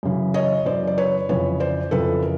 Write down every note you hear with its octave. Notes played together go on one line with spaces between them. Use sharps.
F#2 C#3 E3
C#5 D#5
F#2 C#3 E3 C5 D5
D5
B4 C#5
F2 C#3 E3 B4 C#5
C5 D5
F2 C#3 E3 A4 B4
A#4